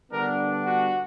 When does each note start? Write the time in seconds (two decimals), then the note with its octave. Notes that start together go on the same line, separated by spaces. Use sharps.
0.11 D3 G3 B3 D4 A#4
0.65 F#4